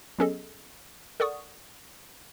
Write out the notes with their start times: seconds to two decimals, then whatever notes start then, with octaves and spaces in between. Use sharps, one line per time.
0.19 F#3 B3 C#4 G#4 A4 D#5
1.20 A4 A#4 D5 F#5 C#6 D#6